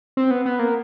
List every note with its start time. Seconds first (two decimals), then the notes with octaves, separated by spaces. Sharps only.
0.17 C4
0.31 B3
0.46 B3
0.59 A#3